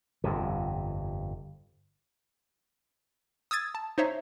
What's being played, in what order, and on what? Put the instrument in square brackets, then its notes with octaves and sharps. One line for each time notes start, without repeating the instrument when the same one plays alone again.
[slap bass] G1 F2 C3
[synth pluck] D#6 E6 G#6 A6
A5
D#4 C5 C#5 E5